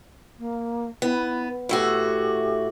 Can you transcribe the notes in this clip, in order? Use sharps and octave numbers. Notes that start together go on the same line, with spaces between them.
A#3
B3 E4
A2 A3 F#4 G4